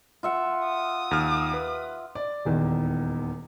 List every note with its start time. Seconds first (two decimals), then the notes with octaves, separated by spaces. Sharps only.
0.23 F4 E5 F#5
0.65 D#6
1.11 D#2 F6
1.53 B4
2.15 D5
2.45 D#1 E2 D#3